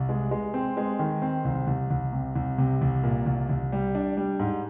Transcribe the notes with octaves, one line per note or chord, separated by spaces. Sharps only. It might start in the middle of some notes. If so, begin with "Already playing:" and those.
Already playing: C2
G#3
G#3
C4
G#3
D#3
C4
C2
C2
C2
C3
C2
C3
C2
A#2
C2
C2
G3
D4
G3
G#2